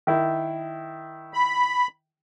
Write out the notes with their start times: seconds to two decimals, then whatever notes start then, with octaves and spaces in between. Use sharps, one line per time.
0.07 D#3 E4
1.34 B5